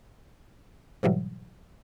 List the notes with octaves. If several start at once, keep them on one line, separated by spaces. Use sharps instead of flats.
G#2 B2 E3 F#3 G3